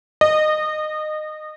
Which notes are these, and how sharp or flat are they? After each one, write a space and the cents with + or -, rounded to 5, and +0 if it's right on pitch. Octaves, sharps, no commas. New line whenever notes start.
D#5 -25